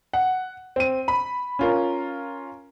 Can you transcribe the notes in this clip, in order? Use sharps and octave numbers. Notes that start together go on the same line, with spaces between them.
F#5
C4 D#7
B5
C#4 F4 A#4